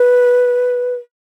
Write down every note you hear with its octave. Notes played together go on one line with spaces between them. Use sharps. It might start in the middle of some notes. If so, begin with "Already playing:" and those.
Already playing: B4